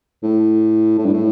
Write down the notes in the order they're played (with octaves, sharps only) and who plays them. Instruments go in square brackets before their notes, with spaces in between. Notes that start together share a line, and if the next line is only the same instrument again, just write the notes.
[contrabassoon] A2
A2
G2
A2